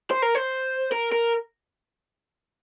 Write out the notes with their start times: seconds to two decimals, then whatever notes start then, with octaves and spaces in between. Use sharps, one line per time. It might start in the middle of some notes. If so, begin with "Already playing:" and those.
0.11 C5
0.22 A#4
0.35 C5
0.92 A#4
1.12 A#4